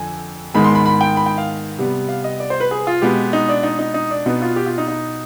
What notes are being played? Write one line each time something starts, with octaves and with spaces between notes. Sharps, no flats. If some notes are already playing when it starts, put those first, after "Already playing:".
Already playing: F2 D3 G#5
G#2 D#3 G#3 B3 B5
C6
B5
B5
G5
B5
G5
F5
C3 G3 B3
F5
D#5
D5
C5
B4
G#4
F4
B2 G#3 B3 G4
D#4
D4
D#4
D#4
D#4
D4
B2 B3 D#4
F4
G4
F4
D#4
D#4